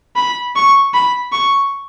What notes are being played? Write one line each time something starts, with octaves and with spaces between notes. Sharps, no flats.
B5
C#6
B5
C#6